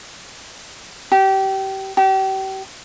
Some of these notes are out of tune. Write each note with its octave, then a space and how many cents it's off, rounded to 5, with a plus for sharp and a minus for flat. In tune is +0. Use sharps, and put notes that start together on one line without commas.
G4 -25
G4 -35